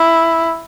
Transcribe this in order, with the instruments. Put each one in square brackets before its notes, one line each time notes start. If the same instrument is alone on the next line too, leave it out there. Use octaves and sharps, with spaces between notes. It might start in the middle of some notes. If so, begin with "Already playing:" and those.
Already playing: [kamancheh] E4